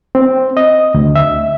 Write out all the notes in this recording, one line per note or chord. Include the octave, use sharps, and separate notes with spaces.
C4
D#5
D2
E5